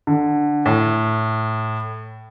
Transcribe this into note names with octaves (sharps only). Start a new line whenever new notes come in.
D3
A2